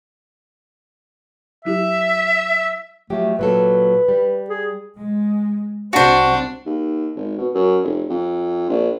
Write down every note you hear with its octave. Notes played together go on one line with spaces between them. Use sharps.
F#3 E4 G4 E5
F3 F#3 A3 G4
A#2 F#3 A4 B4
G3
G#4
G#3
C2 C4 D4 F#4 C5
D#2
G#1
B2
F#2
F1
F2
A#1